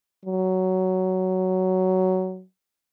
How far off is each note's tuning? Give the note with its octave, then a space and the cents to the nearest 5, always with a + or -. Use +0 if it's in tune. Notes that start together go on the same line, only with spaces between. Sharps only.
F#3 +10